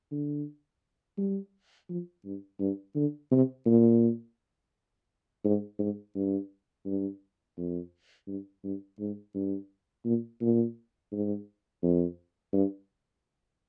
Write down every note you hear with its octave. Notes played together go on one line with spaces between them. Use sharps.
D3
G3
F3
G2
G2
D3
C3
A#2
G#2
G#2
G2
G2
F2
G2
G2
G#2
G2
A#2
A#2
G#2
F2
G2